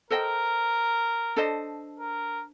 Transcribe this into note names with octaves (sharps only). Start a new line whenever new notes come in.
A4 A#4 C5 D#5 G5
D4 A4 C5 D#5
A#4